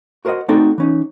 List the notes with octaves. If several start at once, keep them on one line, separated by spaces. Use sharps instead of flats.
F#4 A#4 C5 D5 D#5 F#5
A3 C4 D#4 F#4 A4 D5
E3 C#4 D#4